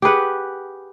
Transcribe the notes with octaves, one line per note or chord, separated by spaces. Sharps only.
G4 G#4 B4 F#5